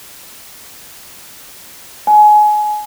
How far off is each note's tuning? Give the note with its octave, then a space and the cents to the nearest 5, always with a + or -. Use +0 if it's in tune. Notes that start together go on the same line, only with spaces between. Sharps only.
G#5 +25